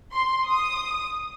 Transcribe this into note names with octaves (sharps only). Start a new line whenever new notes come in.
C6
D#6